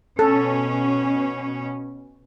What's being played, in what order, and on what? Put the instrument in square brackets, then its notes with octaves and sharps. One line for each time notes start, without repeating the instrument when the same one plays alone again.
[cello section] B2 C#4 [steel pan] A4